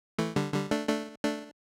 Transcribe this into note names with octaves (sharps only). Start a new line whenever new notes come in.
E3 A3
D3 G3
D3 G3
A3 D4
A3 D4
A3 D4